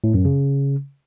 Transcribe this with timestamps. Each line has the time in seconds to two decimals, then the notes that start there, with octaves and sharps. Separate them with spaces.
0.04 A2
0.14 F#2
0.25 C#3